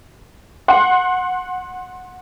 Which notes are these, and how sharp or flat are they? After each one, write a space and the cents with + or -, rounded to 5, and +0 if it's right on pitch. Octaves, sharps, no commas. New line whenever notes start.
F#5 -15 C6 +30